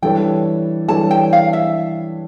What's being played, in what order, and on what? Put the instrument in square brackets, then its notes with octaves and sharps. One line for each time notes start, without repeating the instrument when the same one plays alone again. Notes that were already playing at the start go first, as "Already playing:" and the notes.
[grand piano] E3 G3 D4 A4 C#5 [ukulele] G5
[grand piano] E3 G3 D4 A4 C#5 [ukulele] A5
[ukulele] G5
F5
E5